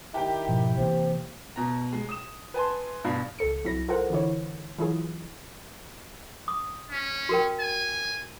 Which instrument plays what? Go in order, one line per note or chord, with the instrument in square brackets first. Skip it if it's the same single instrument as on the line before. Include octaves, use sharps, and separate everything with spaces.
[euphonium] D#3 [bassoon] E4 [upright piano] G4 G5
[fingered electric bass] G#2 B2 F3
[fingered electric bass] C3 E3 A#3 [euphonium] C4
[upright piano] B2 A#5
G#3
D#6 E7
B4 G#5 A5 C6
G2 B2 F5 B5
[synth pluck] C#2 A4 C#7
C2 F#3 E4 A#6
F4 A4 A#4 C5 F#5
D3 E3 E4 C#5
E3 F#3 E4 F4 G#4
[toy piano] D#6
[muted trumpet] C#4
[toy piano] F#4 A#4 G5
[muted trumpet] G#5